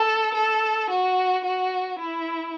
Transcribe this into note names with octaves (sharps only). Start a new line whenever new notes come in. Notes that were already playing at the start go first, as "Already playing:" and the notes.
Already playing: A4
A4
F#4
F#4
E4